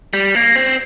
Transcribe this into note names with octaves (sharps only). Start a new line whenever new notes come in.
G3
A#3
C4